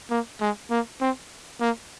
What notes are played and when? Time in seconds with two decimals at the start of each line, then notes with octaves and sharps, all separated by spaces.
0.10 A#3
0.41 G#3
0.70 A#3
1.01 C4
1.61 A#3